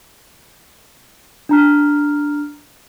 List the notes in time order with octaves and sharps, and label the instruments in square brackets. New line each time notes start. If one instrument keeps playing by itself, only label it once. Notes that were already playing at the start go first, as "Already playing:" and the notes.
[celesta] D4 A#5 F6